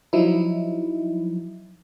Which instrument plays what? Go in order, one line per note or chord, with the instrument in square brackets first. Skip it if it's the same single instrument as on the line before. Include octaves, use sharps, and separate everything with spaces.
[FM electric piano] F3 F#3 D#4 E4